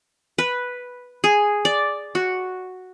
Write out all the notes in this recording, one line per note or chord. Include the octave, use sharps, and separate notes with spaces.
B4
G#4
D5
F#4